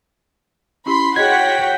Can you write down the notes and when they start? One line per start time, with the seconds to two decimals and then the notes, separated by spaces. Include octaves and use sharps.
0.86 C#4 E4 G4 B5 C6
1.16 F#4 G#4 C#5 D#5 F#5 G5 G#6 B6